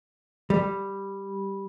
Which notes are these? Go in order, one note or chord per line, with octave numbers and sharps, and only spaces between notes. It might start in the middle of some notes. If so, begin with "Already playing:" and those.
G3